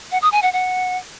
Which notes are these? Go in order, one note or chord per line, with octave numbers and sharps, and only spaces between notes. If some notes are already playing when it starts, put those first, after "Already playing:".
F#5
D#6
G#5
F#5
F#5